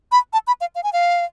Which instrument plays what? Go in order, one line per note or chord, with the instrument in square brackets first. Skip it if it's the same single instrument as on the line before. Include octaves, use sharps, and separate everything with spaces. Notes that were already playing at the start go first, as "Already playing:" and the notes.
[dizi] B5
A5
B5
F5
F5
G#5
F5